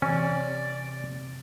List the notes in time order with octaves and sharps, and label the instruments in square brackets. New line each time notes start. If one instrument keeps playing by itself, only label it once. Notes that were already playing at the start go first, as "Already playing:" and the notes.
[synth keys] C3 [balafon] E3 [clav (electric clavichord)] C#4 [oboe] D5